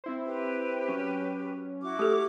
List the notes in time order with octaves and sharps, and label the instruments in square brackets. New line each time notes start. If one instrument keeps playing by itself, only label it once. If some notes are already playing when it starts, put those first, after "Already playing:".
[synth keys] C4 E4 C5
[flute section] G4 B4
[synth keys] F#3 C#4
[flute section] E4 F#4 D6
[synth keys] A3 [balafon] G4 A4